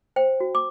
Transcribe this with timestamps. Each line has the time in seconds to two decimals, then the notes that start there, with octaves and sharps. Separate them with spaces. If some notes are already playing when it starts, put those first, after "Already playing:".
0.16 C5 G5
0.40 F#4
0.55 D6